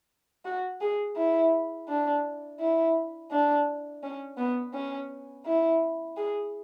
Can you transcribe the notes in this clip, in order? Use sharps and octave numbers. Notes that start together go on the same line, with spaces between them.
F#4
G#4
E4
D4
E4
D4
C#4
B3
C#4
E4
G#4